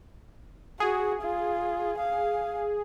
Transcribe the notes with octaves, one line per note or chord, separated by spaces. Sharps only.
F#4 G#4
F4
F5